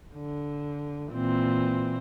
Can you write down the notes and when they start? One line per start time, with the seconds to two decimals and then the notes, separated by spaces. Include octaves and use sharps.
0.15 D3
1.11 A#2 E3 C4